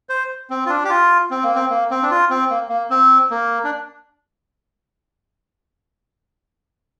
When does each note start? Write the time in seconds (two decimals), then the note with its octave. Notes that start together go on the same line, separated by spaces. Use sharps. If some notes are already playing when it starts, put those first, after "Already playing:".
0.09 C5
0.50 C4
0.66 F4
0.69 D4
0.84 G4
0.90 F4
1.31 C4
1.44 A#3
1.56 C4
1.70 A#3
1.91 C4
2.02 D4
2.11 F4
2.30 C4
2.50 A#3
2.69 A#3
2.90 C4
3.30 A#3
3.64 D4